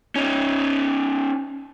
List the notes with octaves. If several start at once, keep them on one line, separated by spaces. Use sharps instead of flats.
C#4 D#4